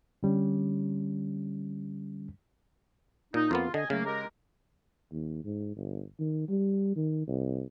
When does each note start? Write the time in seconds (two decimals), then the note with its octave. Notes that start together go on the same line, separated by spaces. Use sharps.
0.23 D3 G3 C#4
3.34 A#2 D#4
3.51 F2 A#3 B3 F4
3.74 D3 D#5 G#5
3.90 C#3 F#3 A3 A#3
4.05 G#3 G4 A#4
5.12 D#2
5.45 G#2
5.76 G1
6.20 D#3
6.49 G3
6.96 D#3
7.27 C2